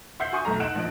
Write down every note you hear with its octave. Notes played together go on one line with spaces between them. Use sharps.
E5 F#5 G6 C7
F#4 G#5 C#6 D#6
B1 A3 A#5
D#4 F#5 F#6 D7 E7
A#1 F3 D#4 D7